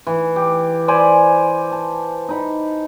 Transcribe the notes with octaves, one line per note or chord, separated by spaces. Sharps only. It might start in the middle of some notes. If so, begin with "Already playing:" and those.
E3
G4
C5 D5 G#5 B5
A5
D#4 B5